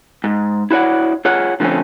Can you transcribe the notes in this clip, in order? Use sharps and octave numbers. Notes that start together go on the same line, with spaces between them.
G#2
E4 F#4 C#5 D5 F#5
F4 G#4 C#5 F#5
D3 F3 A3 C4 C#4